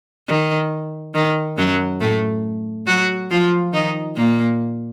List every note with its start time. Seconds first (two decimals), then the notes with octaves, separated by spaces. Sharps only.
0.28 D#3
1.15 D#3
1.58 F#2 F#3
2.01 A2 A3
2.87 F#3 F#4
3.31 F3 F4
3.73 D#3 D#4
4.17 A#2 A#3